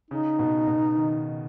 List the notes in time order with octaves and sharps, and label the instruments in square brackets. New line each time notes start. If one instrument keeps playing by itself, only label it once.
[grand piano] C#3 [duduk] D#4
[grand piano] B2
B2
D#3